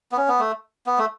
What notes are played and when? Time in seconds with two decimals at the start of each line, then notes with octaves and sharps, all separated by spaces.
0.12 B3
0.17 C#4
0.29 B3
0.40 A3
0.87 B3
0.99 A3